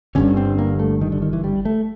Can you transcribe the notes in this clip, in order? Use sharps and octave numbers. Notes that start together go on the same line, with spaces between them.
G1 G2 D3 C#4
C4
A#3
A3
D#3
D3
D#3
E3
G3
A3